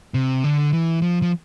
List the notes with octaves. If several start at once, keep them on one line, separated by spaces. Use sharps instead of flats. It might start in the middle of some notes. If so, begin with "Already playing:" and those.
C3
D3
E3
F3
F3